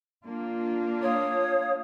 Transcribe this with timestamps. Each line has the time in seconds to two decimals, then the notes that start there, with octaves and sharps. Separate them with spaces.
0.23 A#3 D4 F4
1.02 C#5 F5 D#6